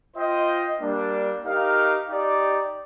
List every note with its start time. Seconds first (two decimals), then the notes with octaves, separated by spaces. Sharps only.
0.15 F4 C5 D#5 G5
0.81 G3 A#3 D4
1.45 D#4 G4 A#4 F5
2.10 D#4 G4 D5